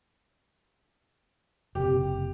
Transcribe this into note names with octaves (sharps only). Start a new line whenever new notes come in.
F#1 C3 G4